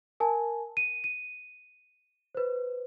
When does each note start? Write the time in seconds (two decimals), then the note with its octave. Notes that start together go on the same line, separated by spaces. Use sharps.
0.20 A#4 G#5 A5
0.77 D#7
1.04 D#7
2.35 B4 C5